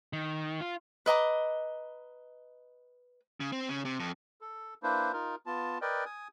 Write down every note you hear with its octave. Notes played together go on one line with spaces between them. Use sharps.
D#3
F4
B4 D#5 A#5 D6
C#3
C4
C#3
C3
F2
A4
A#3 D4 E4 B4 C5
D#4 F4 A#4
B3 F4 A5
A#4 B4 D5 D#5 G5
G#5 D#6